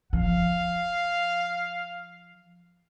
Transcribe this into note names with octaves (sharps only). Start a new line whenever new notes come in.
F3 F5